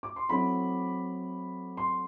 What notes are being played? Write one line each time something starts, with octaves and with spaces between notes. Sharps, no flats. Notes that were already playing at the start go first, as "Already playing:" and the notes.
D6
C6
F#3 A3 C4 E4 B5
C6